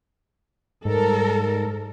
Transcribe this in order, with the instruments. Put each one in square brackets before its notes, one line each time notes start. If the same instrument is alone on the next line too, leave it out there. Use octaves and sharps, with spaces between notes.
[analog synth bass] G#2 [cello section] G3 A4 A#4